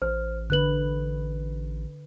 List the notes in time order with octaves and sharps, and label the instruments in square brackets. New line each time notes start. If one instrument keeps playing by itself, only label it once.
[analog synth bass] A1 [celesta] C5 F6
[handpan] D3 B4 [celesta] F#6 F#7